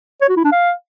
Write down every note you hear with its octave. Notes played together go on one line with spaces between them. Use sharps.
C#5
F#4
E4
D4
F5